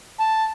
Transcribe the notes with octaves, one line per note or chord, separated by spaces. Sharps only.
A5